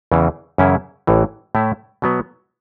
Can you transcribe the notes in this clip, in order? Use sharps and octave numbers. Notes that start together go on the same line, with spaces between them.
E2 C#3 E3
F#2 C#3 E3 C#4 E4
A1 A2 E3
A2 A3 E4
B2 F#3 B3